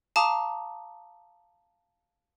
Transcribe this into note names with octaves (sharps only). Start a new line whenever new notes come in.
F5 A5 A#5 D6 D#6